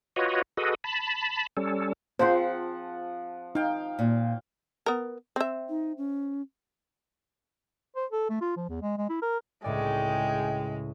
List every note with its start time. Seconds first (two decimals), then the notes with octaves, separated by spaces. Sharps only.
0.16 F4 F#4 B4 C#5 D#5
0.57 F#4 G#4 A4 B4 D#5
0.84 A5 B5
1.57 G3 C#4 A4
2.19 F3 C4 F4 G#4 C5 F#5
3.55 D#4 F5 G5
3.99 A#2
4.86 B3 A#4
5.36 C4 E5
5.69 D#4
5.98 C#4
7.96 C5
8.12 A4
8.30 A3
8.41 F4
8.57 F3
8.69 E2
8.82 G#3
8.98 G#3
9.09 E4
9.22 A#4
9.64 G#1 C#2 A2 G#3 G#4 D5 G5